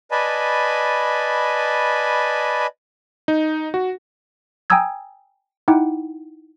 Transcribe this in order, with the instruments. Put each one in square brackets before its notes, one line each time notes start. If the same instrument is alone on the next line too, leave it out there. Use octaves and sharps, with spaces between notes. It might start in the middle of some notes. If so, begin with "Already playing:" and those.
[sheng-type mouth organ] B4 D5 D#5 G#5 A5 B5
[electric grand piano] D#4
F#4
[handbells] G5 G#5 A#5 D#6 E6 G#6
D#4 E4 F#5 G5 D6